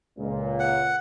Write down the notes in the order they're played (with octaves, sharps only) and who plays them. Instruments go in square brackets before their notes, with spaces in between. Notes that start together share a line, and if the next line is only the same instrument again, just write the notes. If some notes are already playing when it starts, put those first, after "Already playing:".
[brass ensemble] C#2 A#2
[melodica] F#5